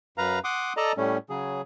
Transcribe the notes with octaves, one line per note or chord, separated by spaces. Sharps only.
F#2 B4 F5 A#5
F#5 C6 D6 D#6
A4 D5 D#5 A5 A#5
A2 G3 A3 C#4
C#3 F#3 G#4